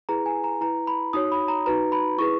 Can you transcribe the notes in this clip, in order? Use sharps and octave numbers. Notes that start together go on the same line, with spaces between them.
E4 G#4 B4 A#5
G#5
A#5
E4 B4 A#5
B5
D#4 F#4 C#5 D#6
B5
A#5
D#4 F#4 B4 A#5
B5
E4 G#4 B4 C#6